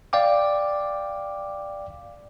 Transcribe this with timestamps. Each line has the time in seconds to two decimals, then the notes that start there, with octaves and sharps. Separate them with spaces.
0.13 D5 F5 G5 D6